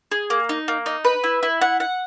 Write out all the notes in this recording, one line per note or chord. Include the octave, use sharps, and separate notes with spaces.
G#4
A#3
D#4
A#3
D#4
B4
E4
E4
F#5
F#5